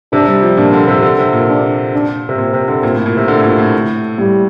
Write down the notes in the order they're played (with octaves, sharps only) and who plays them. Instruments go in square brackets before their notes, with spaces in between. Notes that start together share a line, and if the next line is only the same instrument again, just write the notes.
[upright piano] C3 [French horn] D4
[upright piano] G3
F3
[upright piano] A#2 [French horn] D4
[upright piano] D3
C3
D3
C3
A#2
[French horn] D4
D4
[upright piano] C3
[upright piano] A#2 [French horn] C4
[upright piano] C3
D3
A#2
A2
A#2
C3
D3
A2
A#2
A2
[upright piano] A2 [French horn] G3